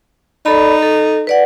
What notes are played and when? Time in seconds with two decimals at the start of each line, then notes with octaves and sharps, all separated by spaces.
0.46 D#4 A4 D5 B5
0.82 A4
1.27 B4 D5 F#5